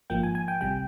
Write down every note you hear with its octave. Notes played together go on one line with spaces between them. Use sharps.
G#1 G#2 F3 A#3 G5
G#5
G#5
G5
C2 C3 G3 G5